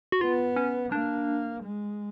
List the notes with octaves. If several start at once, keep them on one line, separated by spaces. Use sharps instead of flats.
F#4
B3 F4
C#4
A#3 D4
G#3